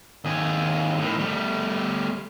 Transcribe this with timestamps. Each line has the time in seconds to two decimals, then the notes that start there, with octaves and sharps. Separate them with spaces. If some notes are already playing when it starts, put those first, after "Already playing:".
0.25 D#2 G#4
0.98 A2 D#3
1.19 G3 A3